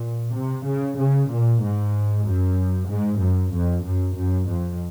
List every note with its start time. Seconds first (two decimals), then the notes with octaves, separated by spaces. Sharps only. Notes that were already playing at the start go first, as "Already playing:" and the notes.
Already playing: A#2
0.34 C3
0.67 C#3
0.99 C#3
1.30 A#2
1.62 G#2
2.26 F#2
2.90 G#2
3.21 F#2
3.52 F2
3.85 F#2
4.17 F#2
4.48 F2